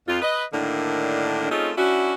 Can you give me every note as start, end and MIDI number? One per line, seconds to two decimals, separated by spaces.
0.08 0.18 41
0.08 0.18 65
0.22 0.43 71
0.22 0.43 75
0.53 1.50 45
0.53 1.50 50
0.53 1.50 51
0.53 1.50 58
0.53 1.50 62
1.51 1.71 57
1.51 1.71 60
1.51 1.71 61
1.51 1.71 63
1.51 1.71 65
1.51 1.71 68
1.78 2.13 61
1.78 2.13 62
1.78 2.13 64
1.78 2.13 66